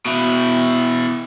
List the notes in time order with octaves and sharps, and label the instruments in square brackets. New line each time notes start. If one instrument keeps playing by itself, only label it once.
[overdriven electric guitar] B2 E4